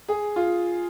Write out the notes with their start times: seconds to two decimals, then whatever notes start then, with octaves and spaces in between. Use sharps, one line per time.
0.09 G#4
0.36 F4